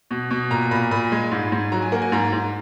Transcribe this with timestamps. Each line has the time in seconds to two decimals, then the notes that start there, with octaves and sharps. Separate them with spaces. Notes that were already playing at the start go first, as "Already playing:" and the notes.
0.11 B2
0.31 B2
0.50 A#2 A#5
0.71 A#2 B5
0.91 A#2 B5
1.12 G#3
1.32 G#2
1.52 G#2
1.72 F#3 A#5
1.82 G#5
1.92 A#3 F#5
2.02 G#5
2.12 G#2 A#5
2.33 G#2